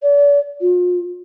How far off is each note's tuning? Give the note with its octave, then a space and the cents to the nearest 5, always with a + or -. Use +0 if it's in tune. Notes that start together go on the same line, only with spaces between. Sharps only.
D5 -45
F4 +40